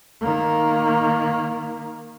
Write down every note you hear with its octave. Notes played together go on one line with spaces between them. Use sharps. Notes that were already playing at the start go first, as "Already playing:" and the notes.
D#3 A#3